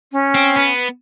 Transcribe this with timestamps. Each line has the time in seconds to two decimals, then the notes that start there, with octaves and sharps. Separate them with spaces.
0.12 C#4
0.35 C4
0.57 B3